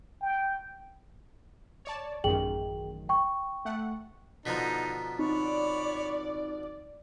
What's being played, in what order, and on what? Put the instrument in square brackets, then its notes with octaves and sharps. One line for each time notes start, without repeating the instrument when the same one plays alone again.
[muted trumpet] G5
[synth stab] C#5 D5 A5
[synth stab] A1 F#2 D#3 [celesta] G#4 G5 F#7
[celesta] G5 C#6
[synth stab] A3 F#5
[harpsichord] B2 D3 F3 [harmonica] D#4 [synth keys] A#5 B6
[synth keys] C4 D#4 [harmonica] C#5 B5 [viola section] D5